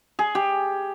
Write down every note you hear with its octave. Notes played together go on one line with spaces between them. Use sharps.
G#4
G4